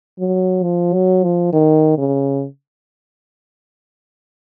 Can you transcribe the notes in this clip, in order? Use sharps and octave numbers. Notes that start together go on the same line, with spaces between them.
F#3
F3
F#3
F3
D#3
C#3